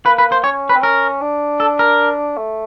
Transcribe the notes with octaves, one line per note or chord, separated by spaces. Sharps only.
A#3 B4
B4
C5
C#4 C#5
B4
C4
C#4 A#4
D4
A4
A#4
A3